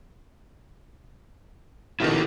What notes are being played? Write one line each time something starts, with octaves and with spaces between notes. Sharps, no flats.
A#1 B2 D#3 E4 G4 A4